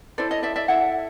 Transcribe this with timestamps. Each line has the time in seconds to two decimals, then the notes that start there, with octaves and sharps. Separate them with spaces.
0.18 E4 A4 C5 D5
0.31 C#5 D#5
0.43 D5 E5
0.56 D5 E5
0.68 E4 A4 E5 F#5